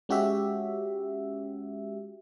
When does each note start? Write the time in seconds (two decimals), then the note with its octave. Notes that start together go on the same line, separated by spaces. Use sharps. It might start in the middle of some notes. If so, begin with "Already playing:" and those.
0.09 G#3 C#4 F#4 G4 E5